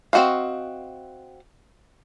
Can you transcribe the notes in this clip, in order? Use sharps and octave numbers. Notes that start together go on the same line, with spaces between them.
C4 D#4 F#4 D#5 F5